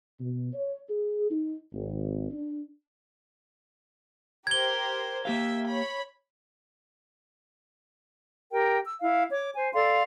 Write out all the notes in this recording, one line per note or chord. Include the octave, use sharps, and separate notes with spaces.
B2
C#5
G#4
D#4
G#1
D4
G4 A#4 C5 G#6 G7
A#3 G4 E5 F5
C#5 B5
G4 A#4 G5
E6
E4 F5
C#5 D6
C5 G#5
A4 D5 F5 C6